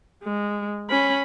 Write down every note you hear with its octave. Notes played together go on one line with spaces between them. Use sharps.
G#3
C#4 B5